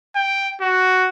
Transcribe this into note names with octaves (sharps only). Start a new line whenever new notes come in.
G5
F#4